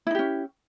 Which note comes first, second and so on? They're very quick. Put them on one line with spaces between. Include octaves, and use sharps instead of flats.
E4 D#4 G4 C#4